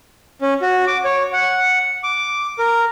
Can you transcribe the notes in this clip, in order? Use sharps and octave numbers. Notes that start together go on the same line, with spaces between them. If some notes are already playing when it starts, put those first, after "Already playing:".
C#4
F#4
D6
C#5
F#5
D6
A#4